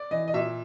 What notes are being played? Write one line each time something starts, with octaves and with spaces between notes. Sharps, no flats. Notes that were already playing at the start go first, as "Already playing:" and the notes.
Already playing: D5
E3 D#5
D#5
A#2 E5